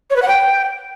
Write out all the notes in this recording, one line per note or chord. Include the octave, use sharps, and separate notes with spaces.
C#5
B4
F#5
G5